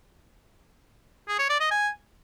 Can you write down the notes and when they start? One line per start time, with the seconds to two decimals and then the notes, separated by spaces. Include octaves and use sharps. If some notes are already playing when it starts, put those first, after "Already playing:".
1.28 G#4
1.39 C#5
1.50 D5
1.60 D#5
1.71 G#5